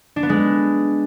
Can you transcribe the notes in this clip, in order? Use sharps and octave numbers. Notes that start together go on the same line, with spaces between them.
D4
B3
G#3